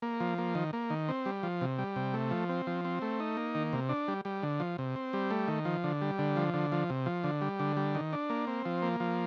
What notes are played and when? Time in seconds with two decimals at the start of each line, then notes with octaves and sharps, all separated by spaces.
0.02 A#3
0.20 F3
0.38 A#3
0.55 D#3
0.73 A#3
0.90 D#3
1.09 C4
1.26 G3
1.43 F3
1.61 C3
1.79 G3
1.96 C3
2.14 A3
2.31 F3
2.49 C4
2.67 F3
2.85 C4
3.02 A3
3.20 D#4
3.37 A#3
3.55 D#3
3.73 C3
3.89 D4
4.08 G3
4.25 G3
4.43 D3
4.60 F3
4.78 C3
4.96 C4
5.13 G3
5.31 A3
5.48 D#3
5.65 F3
5.84 D3
6.02 G3
6.19 D3
6.36 F3
6.54 D3
6.72 F3
6.90 C3
7.06 F3
7.24 D3
7.41 G3
7.59 D3
7.77 G3
7.95 D#3
8.13 D4
8.30 A#3
8.47 C4
8.65 F3
8.82 A#3
9.00 F3